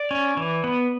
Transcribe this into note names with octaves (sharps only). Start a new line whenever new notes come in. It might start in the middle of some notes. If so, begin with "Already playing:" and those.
Already playing: D5
C#4
E3
B3